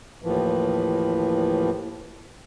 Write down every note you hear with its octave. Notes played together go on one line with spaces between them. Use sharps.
D#2 A2 E3 F3